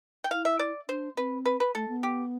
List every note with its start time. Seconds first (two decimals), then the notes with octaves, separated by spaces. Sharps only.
0.24 G5
0.31 E4 F5
0.45 E5
0.59 D5
0.89 D4 C5
1.16 C4 B4
1.45 B4
1.60 B4
1.75 A3 A4
1.88 B3
2.03 G4